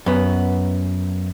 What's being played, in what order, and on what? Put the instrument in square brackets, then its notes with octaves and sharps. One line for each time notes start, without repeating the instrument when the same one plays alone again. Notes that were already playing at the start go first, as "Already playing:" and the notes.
[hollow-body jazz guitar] F#2 B3